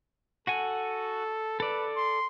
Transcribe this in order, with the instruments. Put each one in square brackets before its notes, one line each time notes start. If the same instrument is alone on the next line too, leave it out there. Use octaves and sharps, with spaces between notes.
[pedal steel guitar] F#4 F#5 G#5 [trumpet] A4
[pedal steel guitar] A4 D5 [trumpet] B4
[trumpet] C6